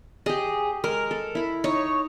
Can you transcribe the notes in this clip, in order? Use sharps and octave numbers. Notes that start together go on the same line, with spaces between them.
G4 G#4 D#5
G#3 A#4
A4
E4 B5
D#4 C#5